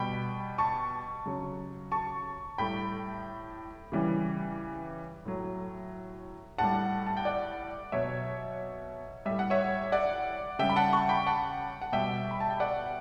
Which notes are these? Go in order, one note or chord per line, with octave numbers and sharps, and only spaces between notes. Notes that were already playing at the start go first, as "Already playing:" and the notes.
Already playing: B2 G3 G5 B5
A5 C#6
C#3 F#3
A5 C#6
A2 G3 G5 B5
C#3 E3 G3
A2 F#3
A2 G3 F#5 A5
A5
G5
D5 F#5
B2 F#3 C#5 E5
A2 G3 E5
F#5
C#5 E5
D5 F#5
C#3 G3 E5 G5
B5
F#5 A5
A5 C#6
G5 B5
F#5 A5
F#5
B2 G3 E5 G5
B5
A5
G5
D5 F#5